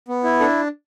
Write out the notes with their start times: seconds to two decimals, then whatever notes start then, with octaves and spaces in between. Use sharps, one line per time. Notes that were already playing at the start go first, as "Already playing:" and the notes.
0.08 B3
0.24 E4
0.40 D4 A4